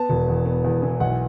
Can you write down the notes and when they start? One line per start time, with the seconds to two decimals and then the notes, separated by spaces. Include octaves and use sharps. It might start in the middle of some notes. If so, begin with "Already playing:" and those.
Already playing: B3 A5
0.10 E1
0.28 E2
0.45 B3
0.65 E2
0.82 E3
1.00 B1 F#5